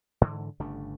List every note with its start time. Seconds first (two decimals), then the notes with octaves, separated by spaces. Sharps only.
0.21 G#2 D3 E3
0.60 G1 C#3 A3 D4